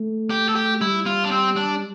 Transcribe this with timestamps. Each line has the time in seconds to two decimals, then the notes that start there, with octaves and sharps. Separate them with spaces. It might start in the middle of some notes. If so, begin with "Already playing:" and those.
Already playing: A3
0.30 G4
0.49 A4
0.55 G4
0.81 G3 E4
1.06 F4
1.24 D4
1.31 C4
1.56 D4